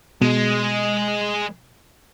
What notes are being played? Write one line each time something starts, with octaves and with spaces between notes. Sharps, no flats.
B2 G#3